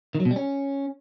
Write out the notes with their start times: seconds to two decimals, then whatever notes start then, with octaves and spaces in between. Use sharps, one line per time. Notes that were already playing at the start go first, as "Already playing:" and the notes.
0.15 D#3
0.20 F#3
0.25 B2
0.31 G3
0.36 C#4